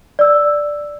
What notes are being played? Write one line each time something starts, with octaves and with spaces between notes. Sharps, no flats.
D5 E6